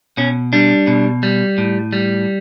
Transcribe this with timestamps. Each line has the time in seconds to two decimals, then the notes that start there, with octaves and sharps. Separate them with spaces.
0.17 B2 C#4
0.53 G3 D4
0.87 B2
1.23 G3
1.58 A2
1.93 G3